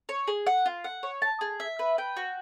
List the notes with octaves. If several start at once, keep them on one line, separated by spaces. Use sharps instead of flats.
C#5
G#4
F#5
F4
F#5
C#5
A5
G#4
E5
B4
G5
F#4